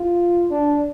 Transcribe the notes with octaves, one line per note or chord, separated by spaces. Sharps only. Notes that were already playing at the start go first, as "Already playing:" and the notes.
Already playing: F4
D4